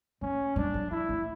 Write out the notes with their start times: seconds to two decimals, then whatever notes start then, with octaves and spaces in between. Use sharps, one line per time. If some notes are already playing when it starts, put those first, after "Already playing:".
0.21 A3 C#4
0.56 G#3 D4
0.74 F#3
0.91 G#3 E4
1.09 A3